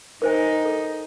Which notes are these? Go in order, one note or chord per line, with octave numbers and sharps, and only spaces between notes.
D#4 A#4 C5 G#5
A4